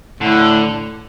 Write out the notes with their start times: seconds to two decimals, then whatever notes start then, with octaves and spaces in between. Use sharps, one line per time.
0.20 A2 D3